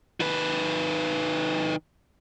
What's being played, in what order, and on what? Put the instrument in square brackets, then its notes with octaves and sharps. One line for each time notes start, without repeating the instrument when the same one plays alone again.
[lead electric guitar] D#3 B4